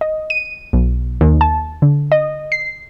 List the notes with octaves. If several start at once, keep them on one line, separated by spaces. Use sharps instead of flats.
D#5
D#7
B1
D#2
A5
D3
D#5
C7